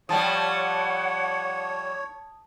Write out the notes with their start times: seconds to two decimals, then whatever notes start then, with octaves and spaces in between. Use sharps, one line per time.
0.09 F3 G3 C#5 F#5 A5 D#6